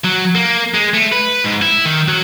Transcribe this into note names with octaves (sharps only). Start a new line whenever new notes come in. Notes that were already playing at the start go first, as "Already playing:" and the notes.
F#3
A#3
G#3
A3
B4
G#2
E4
D#3
F#3